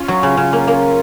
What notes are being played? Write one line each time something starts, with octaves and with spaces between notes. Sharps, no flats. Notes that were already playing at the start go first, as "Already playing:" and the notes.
Already playing: C#4 F4
F#3
C#3
C#3
A#3
A#3